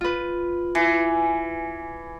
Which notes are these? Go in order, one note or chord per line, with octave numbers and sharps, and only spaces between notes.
F4 B4
E3